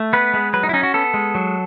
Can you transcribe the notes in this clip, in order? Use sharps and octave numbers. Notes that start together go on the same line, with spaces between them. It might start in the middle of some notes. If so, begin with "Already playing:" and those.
Already playing: A3
B3 B4
G#3
F#3 B4
D#4
E4
C#4 D#4
F#4
B3 A4
G#3
F#3